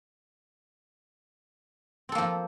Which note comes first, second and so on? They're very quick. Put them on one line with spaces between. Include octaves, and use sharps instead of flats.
C4 A4 A#3 F3